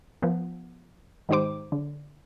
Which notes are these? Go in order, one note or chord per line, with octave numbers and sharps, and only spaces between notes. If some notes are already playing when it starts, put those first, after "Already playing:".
F3 B3
G#2 D#3 D#4 G4 C5 D6
D3